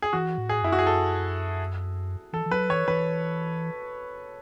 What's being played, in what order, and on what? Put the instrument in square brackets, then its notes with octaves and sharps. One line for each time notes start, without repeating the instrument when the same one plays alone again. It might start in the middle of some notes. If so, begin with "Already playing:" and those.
[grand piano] G#4
[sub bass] E3 [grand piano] F#4
[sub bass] A2
[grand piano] G#4
[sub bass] F#2 [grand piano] E4
[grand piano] F#4
G#4
A4
[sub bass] E3 [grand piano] A4
[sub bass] E3
[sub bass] F#3 [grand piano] B4
[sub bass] E3 [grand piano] C#5
[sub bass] E3 [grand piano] B4